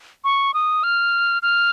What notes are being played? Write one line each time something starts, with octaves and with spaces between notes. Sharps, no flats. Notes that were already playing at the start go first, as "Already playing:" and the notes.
C#6
D#6
F6
F6